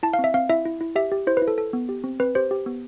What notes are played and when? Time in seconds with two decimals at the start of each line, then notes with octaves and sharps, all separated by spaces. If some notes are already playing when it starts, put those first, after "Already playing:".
0.03 E4 A5
0.14 F5
0.19 C4
0.24 E5
0.34 C4 F5
0.49 E4 E5
0.65 E4
0.81 E4
0.96 G4 E5
1.12 G4
1.27 E4 C5
1.37 B4
1.42 E4
1.48 A4
1.58 A4
1.73 B3
1.89 G4
2.04 C4
2.20 C4 B4
2.35 G4 C5
2.51 G4
2.66 B3